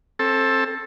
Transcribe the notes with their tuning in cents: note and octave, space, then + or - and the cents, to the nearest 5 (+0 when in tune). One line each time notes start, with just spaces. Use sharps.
C4 +25 A4 +0